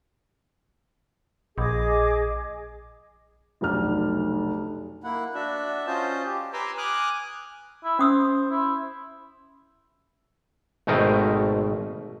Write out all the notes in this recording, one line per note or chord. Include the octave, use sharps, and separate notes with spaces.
A#1 G#4 D#5 D6
F1 B1 D4 F6
A#3 E4 F#5
D4 F#4 E5
C#4 F4 C5 D#5 A5
G4
B4 G#5 A#5 C6 D6 E6
G#5 D6 D#6 F6 F#6
E4
C#4 C5 D#6 E6
E4
G#1 B2 A3 C4 A#4 D#5